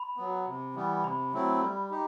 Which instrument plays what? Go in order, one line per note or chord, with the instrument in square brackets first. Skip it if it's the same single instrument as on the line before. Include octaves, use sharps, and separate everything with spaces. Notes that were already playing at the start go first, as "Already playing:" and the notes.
Already playing: [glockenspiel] B5
[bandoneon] F#3 B3
C3
E3 G3 B3
[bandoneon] C3 [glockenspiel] B5
[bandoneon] F#3 A3 C4 E4
G3
D#4 G4